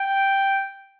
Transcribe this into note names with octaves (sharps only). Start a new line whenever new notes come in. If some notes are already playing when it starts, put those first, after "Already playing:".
Already playing: G5